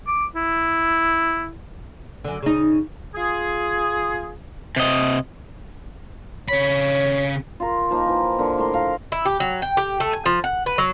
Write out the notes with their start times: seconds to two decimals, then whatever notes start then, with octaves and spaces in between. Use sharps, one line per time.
0.07 D6
0.36 E4
2.24 F#2 D3
2.42 C#3 D#4
3.15 F4 G#4
4.76 C3 D#5
6.48 C#3 C#5 B5
7.60 F4 A#4
7.90 F3 A#3 D#4
8.07 E3 F3
8.39 D3 A#3
8.58 A2 A#4 C6
8.73 A#4 F5
9.12 E4
9.26 G4
9.40 F#3
9.62 G5
9.77 G4
10.00 A3
10.13 G#5
10.26 F3
10.44 F#5
10.66 B4
10.78 F#3